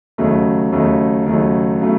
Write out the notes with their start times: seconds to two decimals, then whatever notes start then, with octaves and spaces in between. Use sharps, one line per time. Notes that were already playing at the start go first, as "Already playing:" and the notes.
0.18 D#2 C#3 F#3 A3 D#4
0.72 D#2 C#3 F#3 A3 D#4
1.26 D#2 C#3 F#3 A3 D#4
1.81 C#3 F#3 A3